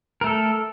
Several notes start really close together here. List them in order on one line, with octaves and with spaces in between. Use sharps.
A#4 A3 A4